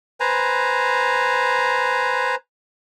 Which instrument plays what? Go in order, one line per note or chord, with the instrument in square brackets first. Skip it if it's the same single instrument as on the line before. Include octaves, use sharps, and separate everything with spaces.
[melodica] B4 C5 G#5 A#5